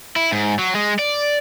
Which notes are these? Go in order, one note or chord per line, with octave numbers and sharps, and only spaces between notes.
E4
G#2
F#3
G#3
D5